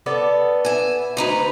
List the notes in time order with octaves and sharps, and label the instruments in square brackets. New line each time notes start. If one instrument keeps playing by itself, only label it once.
[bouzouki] B3 A4 D5
[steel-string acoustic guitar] E5 G#5
D2 D#4 B4